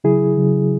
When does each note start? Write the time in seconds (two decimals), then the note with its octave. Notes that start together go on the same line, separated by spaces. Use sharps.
0.04 C#3 F#3 E4 G#4
0.37 C#3 F#3